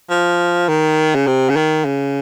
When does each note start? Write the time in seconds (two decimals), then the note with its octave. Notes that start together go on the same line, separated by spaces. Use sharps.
0.10 F3
0.69 D#3
1.15 C#3
1.27 C3
1.50 C#3
1.56 D#3
1.86 C#3